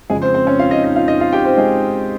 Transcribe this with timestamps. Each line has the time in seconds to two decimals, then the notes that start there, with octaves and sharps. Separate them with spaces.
0.10 F2 C#3 G#3 G#4
0.22 C4 C5
0.34 C4 C5
0.47 C#4 C#5
0.59 F4 F5
0.71 D#4 D#5
0.84 D#4 D#5
0.96 F4 F5
1.08 D#4 D#5
1.20 F4 F5
1.33 G4 G5
1.45 C4 C5
1.57 G#3 G#4